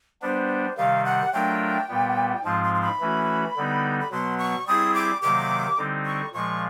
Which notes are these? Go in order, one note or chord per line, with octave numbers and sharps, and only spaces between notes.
G3 B3 D4 C5
C3 D#3 G3 F5
F#5
F#3 A3 D4 F4 A#4 G5
A#2 G3 B3
G#2 F3 G#3 C4 F4 A5
C6
C6
B5
E3 A3 C#4 F#4
D3 G3 B3 D#4
B5
B2 F#3 B3 C6
C#6
G3 C4 E4 G#4 D#6
D6
C3 D#3 F#3 A#3 D6
D3 G3 C4 D#4
C#6
A#2 F3 G#3 C#6